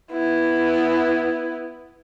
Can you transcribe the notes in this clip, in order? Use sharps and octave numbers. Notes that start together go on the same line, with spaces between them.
B3 E4